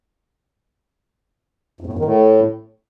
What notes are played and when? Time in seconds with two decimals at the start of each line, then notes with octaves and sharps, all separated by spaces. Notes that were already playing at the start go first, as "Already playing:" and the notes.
1.81 F2
1.87 A2
1.93 F#2
1.99 D#3
2.05 A2